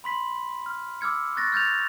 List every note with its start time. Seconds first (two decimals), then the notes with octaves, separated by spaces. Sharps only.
0.04 B5 C6 B6 F#7
0.66 F6
1.01 D6 E6 F6 G#6 C#7
1.36 C#6 F#6 A6 A#6
1.52 F6 G6 A6 F7